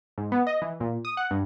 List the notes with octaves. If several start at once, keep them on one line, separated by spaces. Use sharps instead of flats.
G#2
B3
D#5
E3
A#2
D#6
F#5
G2